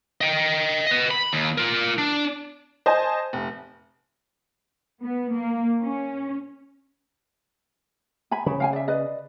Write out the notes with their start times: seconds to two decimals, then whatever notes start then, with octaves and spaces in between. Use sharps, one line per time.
0.21 D#5 G5
0.87 B4 D#5
1.11 B5
1.33 D#2
1.58 F4 A#4
1.98 D4
2.86 C5 D#5 G#5 A5
3.33 F1
5.02 B3
5.32 A#3
5.81 C#4
8.31 G#5 B5
8.46 C#3 B5
8.60 F5 G5 G#5
8.73 D5 E5
8.88 B4 D5 D#5